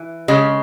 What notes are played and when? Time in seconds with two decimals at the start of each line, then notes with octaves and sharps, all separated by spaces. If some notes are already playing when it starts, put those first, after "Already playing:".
Already playing: E3
0.28 C#3 G#3